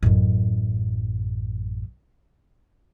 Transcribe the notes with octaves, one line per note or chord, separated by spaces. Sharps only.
A1 F#2